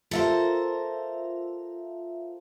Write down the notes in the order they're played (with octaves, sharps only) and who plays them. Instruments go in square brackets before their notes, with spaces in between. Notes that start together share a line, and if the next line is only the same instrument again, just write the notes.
[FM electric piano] F4 E5 F5 [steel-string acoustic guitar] A4 A#4 C5